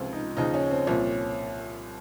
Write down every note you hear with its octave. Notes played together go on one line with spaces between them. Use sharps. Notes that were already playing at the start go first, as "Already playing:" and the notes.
Already playing: C#2 C3 F3 F4
D#4
D#2 C#3 F3 D#4
C#4
C4
C2 A#2 F3 C#4